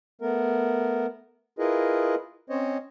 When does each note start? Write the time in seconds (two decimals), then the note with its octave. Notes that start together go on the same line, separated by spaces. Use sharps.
0.21 A3 B3 A#4
1.59 E4 F4 G#4 A#4 B4 D#5
2.50 C4 C#4 C5 C#5 D#5